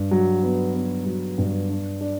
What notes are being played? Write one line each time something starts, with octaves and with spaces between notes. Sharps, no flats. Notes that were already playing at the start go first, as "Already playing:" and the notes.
Already playing: G2
F#3
B3
B3
F#3
G2
D4
D4